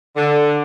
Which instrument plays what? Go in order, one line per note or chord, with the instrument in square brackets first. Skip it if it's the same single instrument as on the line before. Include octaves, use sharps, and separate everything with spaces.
[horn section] D3